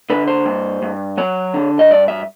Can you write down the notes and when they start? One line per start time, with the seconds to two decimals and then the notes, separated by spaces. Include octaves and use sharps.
0.10 D3 B4
0.28 C5
0.45 G2
0.82 G2
1.17 F#3 C#5
1.54 D3
1.79 D#5
1.91 G2 D5
2.08 E5